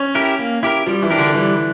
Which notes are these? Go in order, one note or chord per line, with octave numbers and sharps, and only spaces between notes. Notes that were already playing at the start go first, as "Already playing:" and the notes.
Already playing: C#4
E4 G4 A#4
A#3
E4 G4 A#4
F3 G3
E3
D4 G4 A#4
D3
E3 G3